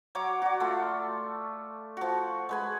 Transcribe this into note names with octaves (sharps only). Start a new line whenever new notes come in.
F#3 C#5 F#5 D6
F#4 D5
A3 F4
F3 F#4
G#3 B4 G#5